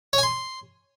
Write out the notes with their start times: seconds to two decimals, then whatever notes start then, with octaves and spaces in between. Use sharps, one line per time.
0.13 C#5
0.18 G#5
0.23 C6